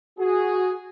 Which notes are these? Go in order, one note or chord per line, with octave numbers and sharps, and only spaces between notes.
F#4 G#4